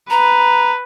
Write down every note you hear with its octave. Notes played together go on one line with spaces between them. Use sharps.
B4 A#5